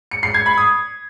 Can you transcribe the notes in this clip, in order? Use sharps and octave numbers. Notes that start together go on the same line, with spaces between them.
C#7
C7
G#6
B5
D#6